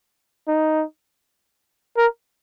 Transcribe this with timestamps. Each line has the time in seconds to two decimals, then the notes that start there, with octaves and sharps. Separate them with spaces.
0.48 D#4
1.97 A#4